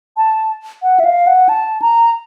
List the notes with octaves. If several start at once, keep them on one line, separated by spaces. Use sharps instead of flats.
A5
F#5
E5
F5
F#5
A5
A#5